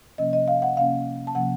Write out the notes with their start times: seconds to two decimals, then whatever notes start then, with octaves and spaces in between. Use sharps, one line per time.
0.18 C3 F3 A#3 C#4 D#5
0.33 D#5
0.48 F5
0.62 F#5
0.77 C3 F3 A#3 C#4 F5
1.27 A5
1.35 C3 F3 A#3 C#4 F#5